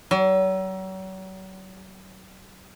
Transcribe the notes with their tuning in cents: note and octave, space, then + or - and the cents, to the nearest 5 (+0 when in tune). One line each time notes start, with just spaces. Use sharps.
F#3 +40